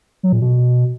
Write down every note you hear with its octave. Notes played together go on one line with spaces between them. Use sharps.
F#3
A#2
B2